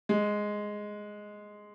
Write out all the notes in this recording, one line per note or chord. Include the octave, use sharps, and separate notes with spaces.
G#3